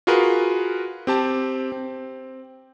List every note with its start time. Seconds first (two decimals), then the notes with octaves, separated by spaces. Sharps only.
0.07 F4 F#4 G#4 A#4 B4
1.07 C4 G4 A5
1.72 C4